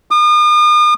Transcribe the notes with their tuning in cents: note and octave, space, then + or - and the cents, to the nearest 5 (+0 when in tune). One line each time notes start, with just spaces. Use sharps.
D#6 -45